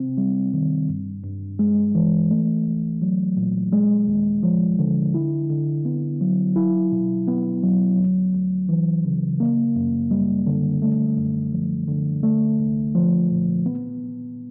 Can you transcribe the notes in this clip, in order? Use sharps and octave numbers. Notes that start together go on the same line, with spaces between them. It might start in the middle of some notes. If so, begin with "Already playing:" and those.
Already playing: C3 C4
G3
D#3
G2
G2
G#3
E3
A3
C2
F#3
A#2
G#3
D#2
F3
D3
E4
D3
B3
F#3
E4
B2
B3
F#3
D2
D2
E3
C#3
A#3
F#2
G3
D3
A3
F#2
F3
D3
A3
C2
F3
A#2
B3